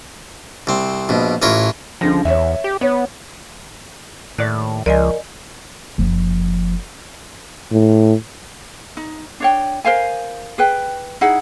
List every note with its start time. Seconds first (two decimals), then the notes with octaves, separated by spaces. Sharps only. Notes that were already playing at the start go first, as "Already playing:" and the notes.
0.67 C2 C4
1.09 A#1 B2
1.42 A1 E3 F4 A#4 C#5
2.01 C#2 D3 F3 A#6
2.25 E2 C#5 E5
2.64 G4
2.81 B3 C#5
4.38 D#2 A2 D5 F#6
4.86 C#2 F3 A#4 D5 D#5 G#5
5.98 F#1 F3
7.72 A2
8.97 D#4
9.40 D4 C#5 G5
9.85 A#4 C5 F5 G#5
10.58 G#4 B4 G5
11.21 D#4 E4 G#4 F#5